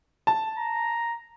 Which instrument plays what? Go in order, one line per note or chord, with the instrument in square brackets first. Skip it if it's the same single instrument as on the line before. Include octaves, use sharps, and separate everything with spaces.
[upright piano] A5
[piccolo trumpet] A#5